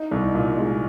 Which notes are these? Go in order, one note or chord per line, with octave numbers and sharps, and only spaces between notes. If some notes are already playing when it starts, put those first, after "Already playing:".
Already playing: D#4
C2
A#2
G#3